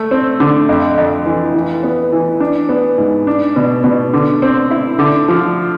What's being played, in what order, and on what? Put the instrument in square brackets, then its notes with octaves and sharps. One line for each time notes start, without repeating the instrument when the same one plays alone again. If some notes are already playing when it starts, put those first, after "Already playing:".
Already playing: [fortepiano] A3
C4
D3
F2
F2
E3
E3
B3
E3
D4
B3
G#2
D4
B2
B2
D3
C4
E4
D3
F3